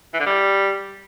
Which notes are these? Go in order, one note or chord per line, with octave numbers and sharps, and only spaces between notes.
E3
D3
G3